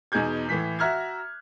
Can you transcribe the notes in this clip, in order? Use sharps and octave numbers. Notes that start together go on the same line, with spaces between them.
E2 B2 D#4 G#4 G6 G#6
A2 E3 B6
F#4 E5 A#5 F6 F#6 G#6